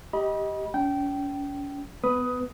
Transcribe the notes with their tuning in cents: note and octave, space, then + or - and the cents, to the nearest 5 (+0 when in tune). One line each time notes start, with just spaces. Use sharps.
G4 +0 D#5 +15 B5 -35
C#4 +40 G5 -20
B3 +15 B4 +5 D#6 +10